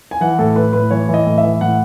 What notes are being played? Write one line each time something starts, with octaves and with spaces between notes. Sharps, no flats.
G#5
E3 F#5
A2 A4
A2 B4
A2 B4
E3 C#5
E3
D#5
A2
E5
E3
A2 F#5